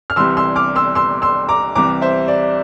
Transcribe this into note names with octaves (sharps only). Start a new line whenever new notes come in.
F6
C2 C3 E3 C6 E6
C6 E6
D6 F6
C6 E6
C6 E6
C6 E6
A#5 D6
C2 C3 E3 A#5 D6
C5 E5
D5